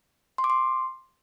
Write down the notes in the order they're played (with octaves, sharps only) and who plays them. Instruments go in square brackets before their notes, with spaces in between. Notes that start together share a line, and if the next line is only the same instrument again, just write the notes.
[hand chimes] C6
D6
C6